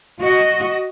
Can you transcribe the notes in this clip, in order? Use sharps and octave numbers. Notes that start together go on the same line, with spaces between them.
F#4 D#5